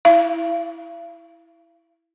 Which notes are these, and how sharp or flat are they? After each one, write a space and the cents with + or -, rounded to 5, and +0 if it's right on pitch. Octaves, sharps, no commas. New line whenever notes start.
E4 +0 F5 -45